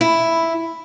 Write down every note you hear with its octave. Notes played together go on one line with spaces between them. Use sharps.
E4